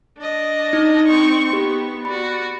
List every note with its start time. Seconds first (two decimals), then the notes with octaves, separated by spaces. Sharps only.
0.19 D4 D#5
0.73 D#4
1.08 C4 C#6
1.53 B3 G4
2.05 F#4 D5 B5